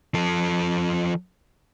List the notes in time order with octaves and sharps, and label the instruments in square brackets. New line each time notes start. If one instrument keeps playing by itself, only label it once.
[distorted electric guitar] F3 A4